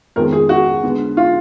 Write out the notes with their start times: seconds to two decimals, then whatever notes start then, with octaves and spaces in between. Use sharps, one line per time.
0.16 F2 D#3 G#3 B3 A#4
0.32 G#4
0.49 F#4
0.83 D3 G#3 B3
1.17 F4